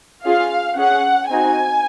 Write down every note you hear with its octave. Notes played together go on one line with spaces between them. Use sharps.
C#4 F4 G#4 F5
C#4 G#4 F#5
C4 D#4 F#4 G#5